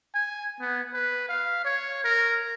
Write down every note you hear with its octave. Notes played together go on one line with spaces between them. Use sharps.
G#5
B3
B4
F5
C#5
A#4